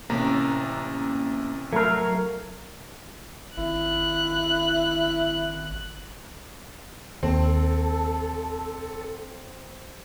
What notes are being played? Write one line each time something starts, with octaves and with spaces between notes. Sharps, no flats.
A1 C3 A#3 C#4 A#5
F#3 A3 A#4 F5 G#6
G#1 E4 F#6
D#2 C4 A4